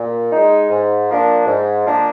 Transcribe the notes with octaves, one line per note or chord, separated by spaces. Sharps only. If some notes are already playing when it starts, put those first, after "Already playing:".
Already playing: A#2
G#3 D#4
G#2
F3 A#3 D4
G#2
F3 A#3 D4